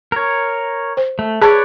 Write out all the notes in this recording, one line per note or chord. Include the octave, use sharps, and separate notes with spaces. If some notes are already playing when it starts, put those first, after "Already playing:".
A#4 C#5
C5
A3
G#4 B4 C#5 D5 A5